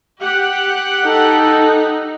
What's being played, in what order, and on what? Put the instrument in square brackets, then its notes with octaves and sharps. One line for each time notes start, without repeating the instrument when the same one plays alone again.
[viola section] G4 F#5
[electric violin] D#4 [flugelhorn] A4